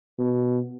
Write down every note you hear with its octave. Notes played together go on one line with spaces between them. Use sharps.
B2